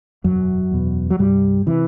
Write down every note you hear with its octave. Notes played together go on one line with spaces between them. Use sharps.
E1 F#2 F#3
E2 B2
F#3
C2 G2 G3
C3 E3